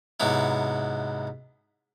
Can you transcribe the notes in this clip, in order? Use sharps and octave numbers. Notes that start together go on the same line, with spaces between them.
G#2 C3 F#3 B3 E4